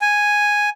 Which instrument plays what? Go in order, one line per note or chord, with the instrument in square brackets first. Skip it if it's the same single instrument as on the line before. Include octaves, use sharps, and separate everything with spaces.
[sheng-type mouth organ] G#5